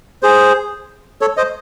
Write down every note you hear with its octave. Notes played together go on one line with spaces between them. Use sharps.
G#4 C5
A4 C#5
C5 D#5